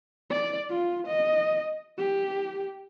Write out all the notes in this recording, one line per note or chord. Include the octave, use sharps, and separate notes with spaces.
D5
F4
D#5
G4